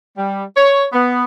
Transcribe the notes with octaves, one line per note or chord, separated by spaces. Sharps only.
G3
C#5
B3